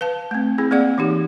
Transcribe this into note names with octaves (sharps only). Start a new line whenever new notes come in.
B4 F5 A5
A3 C4
C4 E4 G#4
A#3 C4 G#4 D5 F5 F#5
E3 D#4 G4